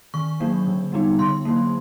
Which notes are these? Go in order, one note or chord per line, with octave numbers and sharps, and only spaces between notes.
D#3 C#6
F#3 A#3 D4
D3
G3 B3 D#4
D3 C6
F#3 A#3